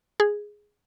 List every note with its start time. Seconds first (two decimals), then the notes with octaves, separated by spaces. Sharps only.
0.20 G#4